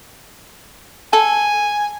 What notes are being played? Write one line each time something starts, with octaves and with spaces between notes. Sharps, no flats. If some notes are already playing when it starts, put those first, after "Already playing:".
A4 G#5